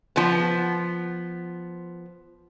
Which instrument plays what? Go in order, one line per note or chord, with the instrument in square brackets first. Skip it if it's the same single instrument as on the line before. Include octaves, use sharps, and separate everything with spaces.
[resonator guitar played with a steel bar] F3 B3